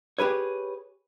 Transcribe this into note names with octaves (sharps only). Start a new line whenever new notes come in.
G4 G#4 B4 C#5